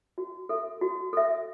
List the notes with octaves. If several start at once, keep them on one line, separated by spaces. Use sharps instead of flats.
F#4
A4 E5
F#4
A4 E5